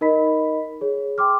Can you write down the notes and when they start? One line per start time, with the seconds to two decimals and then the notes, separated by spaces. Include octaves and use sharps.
0.01 D#4 A#4 D#5 B5 B6
0.81 G#4 C#5
1.18 G5 C6 D6 F6